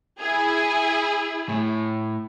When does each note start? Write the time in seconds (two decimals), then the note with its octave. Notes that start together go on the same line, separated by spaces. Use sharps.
0.18 E4 G#4
1.49 A2